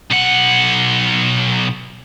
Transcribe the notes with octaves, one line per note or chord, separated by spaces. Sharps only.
B1 F#5